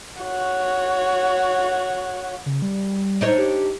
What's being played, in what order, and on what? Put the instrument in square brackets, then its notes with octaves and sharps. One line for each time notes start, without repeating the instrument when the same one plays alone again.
[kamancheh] F#4 C#5
[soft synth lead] C#3
G3
[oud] D4 D#4 C#5
[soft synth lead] G4